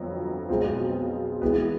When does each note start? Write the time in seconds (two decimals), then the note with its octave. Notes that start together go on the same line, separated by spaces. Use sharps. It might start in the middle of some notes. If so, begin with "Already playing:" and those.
Already playing: G1 F2 D3 F#3
0.49 B1 B2 G#3 C4 F4
1.42 E3 G#3 B3